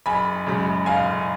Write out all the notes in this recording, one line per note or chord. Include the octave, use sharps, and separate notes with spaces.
F#1 G#5 B5
F#2 C#3 G#3
F#1 F5 G#5